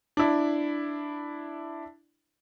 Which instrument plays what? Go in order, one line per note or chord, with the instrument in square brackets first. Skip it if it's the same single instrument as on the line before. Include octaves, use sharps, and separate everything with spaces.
[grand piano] D4 E4